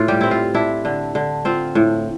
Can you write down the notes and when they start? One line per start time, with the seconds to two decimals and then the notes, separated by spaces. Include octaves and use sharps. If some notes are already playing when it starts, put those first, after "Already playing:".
Already playing: A2 F4
0.08 G3 G4
0.21 C4 E4
0.31 F4
0.54 D4 E4
0.85 D3
1.15 D3
1.45 C4 F4
1.75 A2